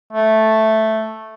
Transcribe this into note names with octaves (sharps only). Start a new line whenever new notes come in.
A3